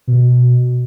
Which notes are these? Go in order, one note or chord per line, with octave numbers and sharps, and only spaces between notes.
B2